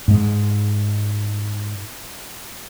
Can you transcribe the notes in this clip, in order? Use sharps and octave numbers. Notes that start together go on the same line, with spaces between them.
G#2 G#3